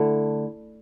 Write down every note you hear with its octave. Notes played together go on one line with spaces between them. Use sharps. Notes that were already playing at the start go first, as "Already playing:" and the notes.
Already playing: D3 A3 E4